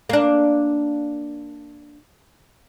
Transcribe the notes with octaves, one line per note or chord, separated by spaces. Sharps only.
A#3 D4